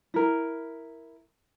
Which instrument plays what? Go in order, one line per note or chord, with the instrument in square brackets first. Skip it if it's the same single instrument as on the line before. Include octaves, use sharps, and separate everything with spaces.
[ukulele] E4 A#4